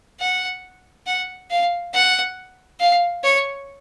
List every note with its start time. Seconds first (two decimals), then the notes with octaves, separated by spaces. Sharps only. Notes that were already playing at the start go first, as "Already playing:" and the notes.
0.20 F#5
1.07 F#5
1.51 F5
1.94 F#5
2.80 F5
3.24 C#5